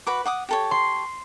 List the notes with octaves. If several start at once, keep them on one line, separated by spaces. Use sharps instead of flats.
F#4 B4 D6
F#5 D6 D#6
G4 A4 C#5
C6